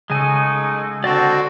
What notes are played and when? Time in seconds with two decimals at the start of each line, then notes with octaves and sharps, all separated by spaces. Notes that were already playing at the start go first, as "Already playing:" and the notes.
0.10 C#3 F#3 G#3 A3 D#4 G#5
1.04 D3 C4 F#4 D5 D#5 A5